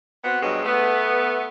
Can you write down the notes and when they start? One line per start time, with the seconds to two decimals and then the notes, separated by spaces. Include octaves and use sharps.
0.23 B3 C4 F#4 F#5
0.42 G2 B2 F#3 G#3
0.64 A3 B3